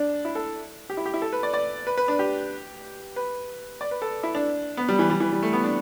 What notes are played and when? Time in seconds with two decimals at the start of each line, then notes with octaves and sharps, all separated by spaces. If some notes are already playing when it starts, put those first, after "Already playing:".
Already playing: D4
0.25 E4
0.35 A4
0.90 G4
0.97 E4
1.06 G4
1.14 E4
1.22 A4
1.33 B4
1.43 D5
1.54 D5
1.87 B4
1.98 B4
2.08 D4
2.19 G4
3.16 B4
3.81 D5
3.91 B4
4.02 A4
4.23 E4
4.35 D4
4.77 B3
4.89 G3
4.99 E3
5.10 G3
5.20 E3
5.32 G3
5.43 A3
5.53 B3
5.64 D4